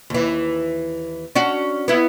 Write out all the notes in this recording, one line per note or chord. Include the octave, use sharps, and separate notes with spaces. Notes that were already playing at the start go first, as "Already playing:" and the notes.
D#2 E3
C#4 D4 F#4
B3 E4